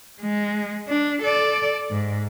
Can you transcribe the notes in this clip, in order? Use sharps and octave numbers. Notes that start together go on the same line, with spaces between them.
G#3
D4
A4 D5
G#2